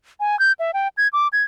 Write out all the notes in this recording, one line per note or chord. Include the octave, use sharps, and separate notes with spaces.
G#5
G6
E5
G5
G#6
D6
G#6